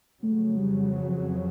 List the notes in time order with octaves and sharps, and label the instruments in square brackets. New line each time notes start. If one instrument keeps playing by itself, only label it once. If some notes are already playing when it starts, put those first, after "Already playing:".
[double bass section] F2 C#3 F#3 [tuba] A3
[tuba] G3